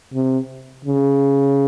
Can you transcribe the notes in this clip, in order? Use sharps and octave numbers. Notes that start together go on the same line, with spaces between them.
C3
C#3